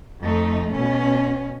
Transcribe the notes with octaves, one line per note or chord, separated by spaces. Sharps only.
F2 A3 D#4
B2 C#4